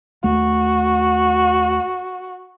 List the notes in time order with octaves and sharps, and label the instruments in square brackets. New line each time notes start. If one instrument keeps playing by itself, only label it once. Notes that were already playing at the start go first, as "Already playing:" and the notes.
[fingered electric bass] D#2 A3 [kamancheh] F#4